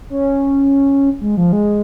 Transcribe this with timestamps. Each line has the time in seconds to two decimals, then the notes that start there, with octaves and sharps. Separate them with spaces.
0.10 C#4
1.21 G#3
1.37 F3
1.53 G#3